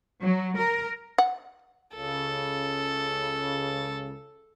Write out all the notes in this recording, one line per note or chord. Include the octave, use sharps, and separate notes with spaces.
F#3
A#4
F#5
C#2 C#3 A4